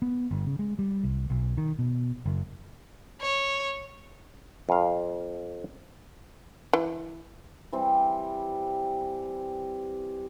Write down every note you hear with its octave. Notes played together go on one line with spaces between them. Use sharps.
B3
G1
C#3
G#3
G3
C2
B1
D#3
B2
F#1
C#5
F2 F5
E3
E3 G3 C4 G4